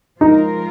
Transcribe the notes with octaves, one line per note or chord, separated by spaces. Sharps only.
F3 G#3 D#4 F4 A#4